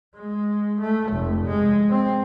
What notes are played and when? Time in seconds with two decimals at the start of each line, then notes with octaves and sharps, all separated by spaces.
0.16 G#3
0.80 A3
1.13 F1
1.46 G#3
1.90 C4